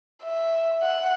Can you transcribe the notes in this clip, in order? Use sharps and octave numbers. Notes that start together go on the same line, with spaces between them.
E5
F#5